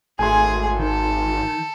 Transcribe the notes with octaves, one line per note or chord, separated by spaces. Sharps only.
G#1 A3 G#4 G#5 C6
D#3 A4